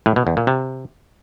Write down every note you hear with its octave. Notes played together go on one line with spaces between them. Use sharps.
A2
B2
E2
A#2
C3